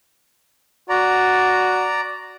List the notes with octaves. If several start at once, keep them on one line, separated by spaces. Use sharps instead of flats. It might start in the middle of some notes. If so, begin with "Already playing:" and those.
F#4 D5 A#5